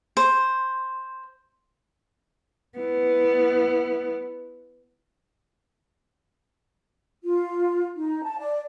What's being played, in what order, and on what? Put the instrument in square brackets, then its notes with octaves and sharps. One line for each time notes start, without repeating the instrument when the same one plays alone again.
[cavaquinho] C5
[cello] B3 E4
[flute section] F4
D#4
A5
D5